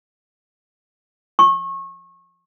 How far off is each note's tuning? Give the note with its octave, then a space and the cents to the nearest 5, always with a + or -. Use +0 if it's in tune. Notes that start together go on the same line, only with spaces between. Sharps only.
C#6 -30